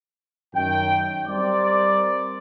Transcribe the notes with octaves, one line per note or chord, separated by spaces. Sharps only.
F#2 D#3 G5
G3 C4 A#4 C5 D5